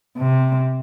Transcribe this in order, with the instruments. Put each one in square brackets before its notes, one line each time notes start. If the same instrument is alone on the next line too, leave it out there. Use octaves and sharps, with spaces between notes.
[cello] C3